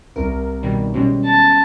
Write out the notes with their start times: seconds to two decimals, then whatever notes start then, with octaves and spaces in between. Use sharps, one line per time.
0.16 C2 A#4
0.63 B2 D#3 G3
0.94 B2 G3 G#3 C#4
1.25 A5